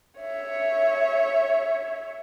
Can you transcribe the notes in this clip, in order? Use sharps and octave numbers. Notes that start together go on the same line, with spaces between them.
C#5 E5